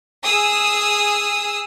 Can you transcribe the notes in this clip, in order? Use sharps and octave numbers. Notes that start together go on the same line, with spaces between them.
G#4 D#6 E6